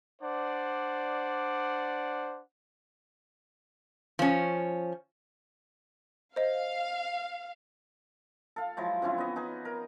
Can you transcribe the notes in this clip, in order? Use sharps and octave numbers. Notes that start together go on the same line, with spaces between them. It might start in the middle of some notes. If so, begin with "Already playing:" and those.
D4 C5 D5 F#5
F3 C#4
C5 D#5 F5
A4 F5
F3 F#3 G#3 E4
D3 C4 C#4 E4
B3 D#5
D#4 G#4 B4
A#4